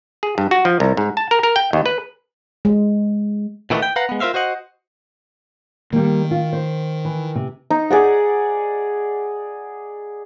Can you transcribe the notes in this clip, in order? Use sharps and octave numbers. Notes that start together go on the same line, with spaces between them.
G#4
G2
F#4
F3
C2
G#2
A5
A#4
A#4
G5
D#2
B4
G#3
A#2 D#3 E3 F#3 A3 B3
G5
B4 F5 F#5 A#5
G#3 B3
F4 A#4 C5 E5 F5
F#4 C5 D#5 F#5
D#3 G3 A#3
F4
C5
E3
C3
D#4
G#4 D5 F#5